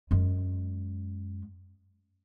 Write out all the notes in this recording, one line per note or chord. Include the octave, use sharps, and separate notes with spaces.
F#2 G#3